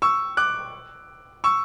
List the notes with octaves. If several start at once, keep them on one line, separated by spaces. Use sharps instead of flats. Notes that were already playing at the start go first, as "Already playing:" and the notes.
C#6 E6
D6 F#6
C#6 E6